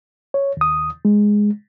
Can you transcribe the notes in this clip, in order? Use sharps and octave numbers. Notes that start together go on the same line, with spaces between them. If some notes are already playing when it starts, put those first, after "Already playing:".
C#5
D#2 D#6
G#3